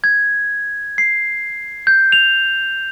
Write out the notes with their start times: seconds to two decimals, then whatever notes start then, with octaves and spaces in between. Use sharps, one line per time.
0.04 G#6
0.98 C7
1.87 G6
2.12 F7